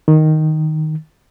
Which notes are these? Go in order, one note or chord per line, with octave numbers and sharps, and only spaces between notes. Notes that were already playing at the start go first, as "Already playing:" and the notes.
D#3